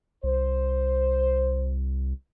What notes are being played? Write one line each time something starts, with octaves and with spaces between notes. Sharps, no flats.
C2 C5